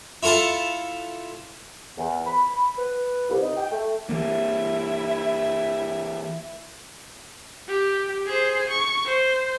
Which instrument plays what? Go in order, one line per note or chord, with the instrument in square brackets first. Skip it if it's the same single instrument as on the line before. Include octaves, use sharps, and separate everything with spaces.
[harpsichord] E4 F4 A4 F#5 A5
[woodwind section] E2
B5
B4
C2
D#4
G5
A3
[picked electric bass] E3 A#3 [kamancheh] E4 E5
[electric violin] G4
G#4 C5
C#6
C5